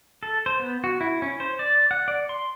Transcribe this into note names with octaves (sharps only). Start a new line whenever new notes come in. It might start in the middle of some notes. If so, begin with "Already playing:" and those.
A4
C5
B3
F#4
E4
C#4
C5
D5
F#5
D5
C6